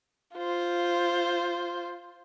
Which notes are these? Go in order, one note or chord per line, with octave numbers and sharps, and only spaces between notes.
F4 C5